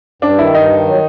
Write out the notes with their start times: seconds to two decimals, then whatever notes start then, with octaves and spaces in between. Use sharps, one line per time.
0.22 G2 D4
0.38 D#3 E4
0.54 G2 D#4
0.71 D#3
0.86 F#3